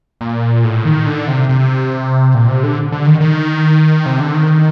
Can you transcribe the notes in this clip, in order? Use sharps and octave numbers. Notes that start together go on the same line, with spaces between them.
A#2
A2
D#3
D3
C3
C3
A#2
C3
D3
D3
D#3
D#3
C3
D3
D#3